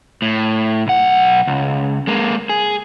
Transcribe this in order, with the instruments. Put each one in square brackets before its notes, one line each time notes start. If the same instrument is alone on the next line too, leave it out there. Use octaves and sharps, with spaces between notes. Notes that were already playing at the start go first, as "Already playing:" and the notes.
[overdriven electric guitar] A2
B1 F#5
C#2
G#3 A#3
G#4